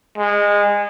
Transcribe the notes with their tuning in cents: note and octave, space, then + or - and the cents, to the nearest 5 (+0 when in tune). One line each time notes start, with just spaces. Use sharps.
G#3 -20